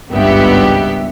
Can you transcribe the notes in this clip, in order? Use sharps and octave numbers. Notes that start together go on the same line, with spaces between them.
G#1 C#2 G2 B3 G4 E5